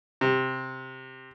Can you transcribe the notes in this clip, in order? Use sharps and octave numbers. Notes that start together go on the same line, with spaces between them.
C3